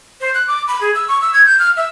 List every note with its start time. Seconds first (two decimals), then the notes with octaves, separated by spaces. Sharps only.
0.21 C5
0.34 F#6
0.48 D6
0.68 B5
0.81 G#4
0.95 E6
1.08 C#6
1.21 E6
1.33 G#6
1.46 G6
1.59 F6
1.77 E5